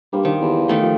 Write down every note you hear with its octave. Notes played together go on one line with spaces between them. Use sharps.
G2 G3 A#3 C5
D#3 F3
E2
D#3 A3 D5 G5
F3